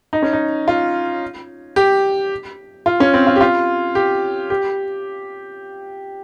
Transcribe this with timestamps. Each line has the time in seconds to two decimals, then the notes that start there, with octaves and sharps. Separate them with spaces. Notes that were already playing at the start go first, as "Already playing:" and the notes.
0.13 D#4
0.22 C#4
0.33 D#4
0.68 F4
1.76 G4
2.86 F4
3.00 C#4
3.14 C4
3.27 F4
3.36 G4
3.41 F4
3.95 G4
4.50 G4